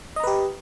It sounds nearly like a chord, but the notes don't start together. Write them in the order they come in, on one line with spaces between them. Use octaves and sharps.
D#5 A#5 B4 G4